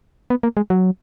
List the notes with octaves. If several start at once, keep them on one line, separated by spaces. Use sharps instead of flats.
B3
A#3
G#3
F#3